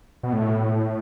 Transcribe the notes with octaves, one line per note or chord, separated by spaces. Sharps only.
B2
A2